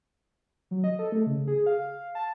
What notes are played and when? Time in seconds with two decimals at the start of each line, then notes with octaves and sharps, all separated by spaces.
0.71 F#3
0.84 D#5
0.99 A4
1.12 A3
1.26 C#3
1.48 G#4
1.66 F5
2.15 A5